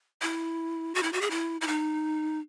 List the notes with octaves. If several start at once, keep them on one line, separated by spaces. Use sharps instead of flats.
E4
F#4
E4
F#4
G#4
E4
E4
D#4